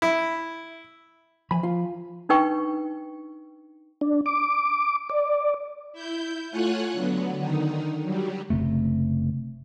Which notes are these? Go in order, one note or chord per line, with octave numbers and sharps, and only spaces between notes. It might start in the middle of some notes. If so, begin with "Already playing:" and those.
E4
E3 F3 G#5 B5
F4
D4 D#4 B4 G5 C#6
D4
D6
D5
E4 G6
A3 F4 C#5 F#5 G#5 F#6
D3 F#3 B3
D3 D#3 D#4
F#3 G3
F#1 E2 C3 A3